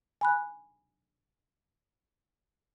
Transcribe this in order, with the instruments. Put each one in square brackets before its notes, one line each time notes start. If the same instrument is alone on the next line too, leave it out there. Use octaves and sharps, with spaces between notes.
[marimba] G#5 B5 F#6